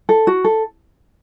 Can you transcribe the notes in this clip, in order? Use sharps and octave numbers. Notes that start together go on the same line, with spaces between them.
A4
F#4
A4